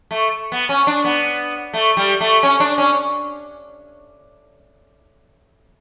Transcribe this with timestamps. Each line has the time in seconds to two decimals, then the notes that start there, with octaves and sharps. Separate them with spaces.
0.11 A3
0.52 B3
0.69 C#4
0.87 D4
1.04 B3
1.73 A3
1.97 G3
2.21 A3
2.43 C#4
2.60 D4
2.78 C#4